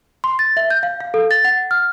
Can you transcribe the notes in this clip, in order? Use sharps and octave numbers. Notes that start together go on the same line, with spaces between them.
C6
A6
E5
G6
F5
F5
A4
A6
F#5
F6